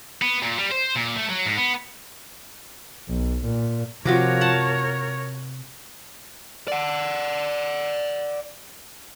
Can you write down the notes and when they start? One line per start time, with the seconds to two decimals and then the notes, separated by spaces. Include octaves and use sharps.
0.22 B3
0.42 A#2
0.58 G3
0.71 C5
0.95 A#2
1.16 A3
1.30 F#3
1.46 G#2
1.58 B3
3.08 B1
3.44 A#2
4.05 C3 F3 F#4 A#4 C#5 D6
4.41 F#5 A5
6.68 D5 F#5